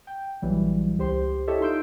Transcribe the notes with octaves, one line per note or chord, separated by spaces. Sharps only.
G5
A#1 E3 F#3 G3
C#2 G4 C5 C6
E4 G4 A4 C#5 D#5 E5
D#4 F4 C6 E6 G6 D7